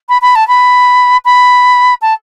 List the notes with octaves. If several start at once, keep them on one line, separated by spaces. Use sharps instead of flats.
B5
B5
A5
B5
B5
A5